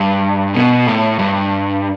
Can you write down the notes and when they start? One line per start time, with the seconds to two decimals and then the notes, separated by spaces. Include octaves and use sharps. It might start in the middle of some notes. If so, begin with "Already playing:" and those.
Already playing: G2
0.54 B2
0.87 A2
1.19 G2